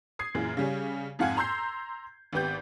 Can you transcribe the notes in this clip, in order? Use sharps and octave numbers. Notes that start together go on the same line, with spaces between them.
D#6 G#6 C7
F#2 A#2 E3 G#4
C#3 G3 C#4
F2 G#2 F5 F#5 G#5 G#6
A#5 C6 E6 G6 C7
G#1 B3 G4 G6